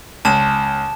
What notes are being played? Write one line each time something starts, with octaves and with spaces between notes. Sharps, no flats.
C#2 A5 E7